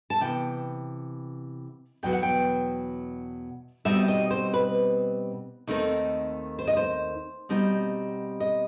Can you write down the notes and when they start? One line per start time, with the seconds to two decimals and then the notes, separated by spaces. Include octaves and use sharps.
0.10 A5
0.21 C3 E3 B3 G5
2.03 E2 B2 F#3 B3 G5
2.13 F#5
2.23 G5
3.85 B2 G3 C4 D#4 E5
4.08 D#5
4.31 C5
4.54 B4
5.67 D#2 D#3 A3 C4 D#4
6.59 C5
6.67 D#5
6.77 C5
7.49 B2 G3 C4 D#4
8.40 D#5